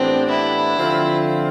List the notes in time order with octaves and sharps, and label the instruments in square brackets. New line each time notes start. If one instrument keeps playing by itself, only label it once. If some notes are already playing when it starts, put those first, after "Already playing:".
Already playing: [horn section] A2 E3 B3 D4 G4 [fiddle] C4
[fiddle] E4
[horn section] D3 F3 C4 F4